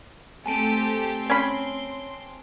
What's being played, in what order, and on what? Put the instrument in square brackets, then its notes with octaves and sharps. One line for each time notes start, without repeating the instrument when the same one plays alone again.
[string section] A3 G4 A4 [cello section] C4 [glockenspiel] G#5 A5 D7
[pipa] C#4 B5 [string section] C6